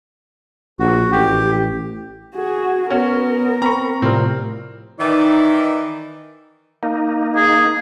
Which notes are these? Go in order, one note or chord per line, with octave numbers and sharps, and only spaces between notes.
A#1 F#4
A1 G4
F#4 G#4
B3 C#4 F#4 A#4 C#5
C4 A#5 B5 C#6
A2 C3 F3 G3 C4 A#4
D#3 E3 D#4 D5
A#3 D#4
G#4